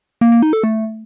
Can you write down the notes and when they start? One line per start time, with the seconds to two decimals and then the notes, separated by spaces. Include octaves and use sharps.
0.21 A#3
0.32 A#3
0.42 D#4
0.53 A4
0.64 A3